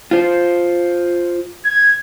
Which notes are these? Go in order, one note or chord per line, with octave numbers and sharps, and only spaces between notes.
F4 C5
G#6